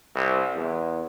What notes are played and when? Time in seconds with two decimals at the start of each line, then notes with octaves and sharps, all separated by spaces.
0.16 C2
0.56 E2